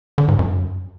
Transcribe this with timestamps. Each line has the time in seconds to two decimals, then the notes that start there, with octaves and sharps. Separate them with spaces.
0.18 D3
0.28 G#2
0.39 F#2